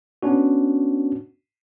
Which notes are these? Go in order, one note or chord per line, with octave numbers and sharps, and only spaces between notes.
B3 C#4 D4 F#4